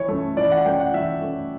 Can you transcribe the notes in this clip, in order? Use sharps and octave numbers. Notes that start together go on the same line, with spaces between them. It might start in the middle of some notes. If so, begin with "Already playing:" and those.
Already playing: E3 C#5
A3 C#4
E3 D5
F#5
A3 C#4 G5
F#5
E3 E5
A3 C#4